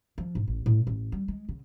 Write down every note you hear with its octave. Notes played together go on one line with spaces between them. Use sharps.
F3
G#2
A1
A2
A1
G3
G#3
C#3